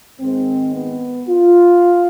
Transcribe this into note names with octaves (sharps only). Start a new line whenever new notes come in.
G#2 D#3 G#3 C4
B3
F4